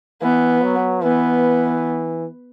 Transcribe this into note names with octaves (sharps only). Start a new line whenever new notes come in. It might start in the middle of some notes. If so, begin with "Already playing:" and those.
E3 B3
F#3
E3 B3